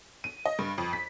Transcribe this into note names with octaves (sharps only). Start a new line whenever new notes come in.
D#7
D#5
G2
F2
B6